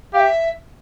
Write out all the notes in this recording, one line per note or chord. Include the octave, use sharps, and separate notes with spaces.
G4 E5 F5